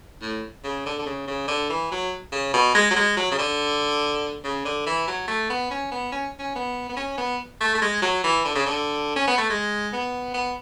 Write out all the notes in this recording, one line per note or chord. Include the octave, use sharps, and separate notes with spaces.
A2
C#3
D3
D3
C#3
C#3
D3
E3
F#3
C#3
B2
G#3
F#3
G#3
F#3
C#3
D3
C#3
D3
E3
F#3
A3
B3
C#4
B3
C#4
C#4
B3
B3
C#4
B3
A3
A3
G#3
F#3
E3
D3
C#3
D3
C#4
B3
A3
G#3
B3
B3